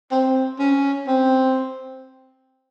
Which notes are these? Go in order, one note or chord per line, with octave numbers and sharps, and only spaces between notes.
C4
C#4
C4